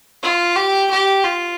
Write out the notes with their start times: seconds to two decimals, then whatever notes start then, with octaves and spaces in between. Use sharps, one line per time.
0.23 F4
0.56 G4
0.90 G4
1.23 F4